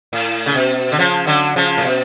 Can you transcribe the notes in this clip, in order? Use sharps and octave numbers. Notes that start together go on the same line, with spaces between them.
A2
C#3
B2
D3
C#3 F3
D3 F#3
C#3 F3
A2
B2